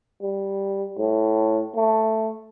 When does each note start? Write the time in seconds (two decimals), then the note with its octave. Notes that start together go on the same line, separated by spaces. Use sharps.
0.22 G3
0.98 A2
1.76 A3